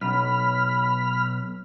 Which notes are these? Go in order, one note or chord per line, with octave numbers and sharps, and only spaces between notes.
B1 B5 F6